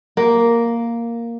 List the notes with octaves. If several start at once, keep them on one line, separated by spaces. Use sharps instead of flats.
A#3